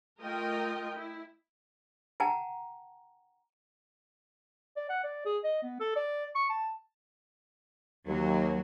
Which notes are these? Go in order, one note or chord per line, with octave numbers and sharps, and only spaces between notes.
A3 F4 A#4 D#5 G5
E4
F#5 G5 A5 A#5
D5
F#5
D5
G#4
D#5
B3
A4
D5
C#6
A5
D#2 F#3